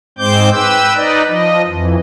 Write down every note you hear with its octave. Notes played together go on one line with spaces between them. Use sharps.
G#2 G#3 C4 C5 D6 G6
B4 G5 E6
D#4 B4 D5 D#5
F3 D#5
F2 E3